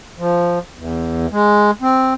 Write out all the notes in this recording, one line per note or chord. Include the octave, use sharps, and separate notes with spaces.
F3
E2
G#3
C4